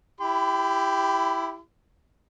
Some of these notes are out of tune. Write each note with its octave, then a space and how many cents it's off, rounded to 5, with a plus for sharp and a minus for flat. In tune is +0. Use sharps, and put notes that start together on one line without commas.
E4 +5 G4 +0 B5 +40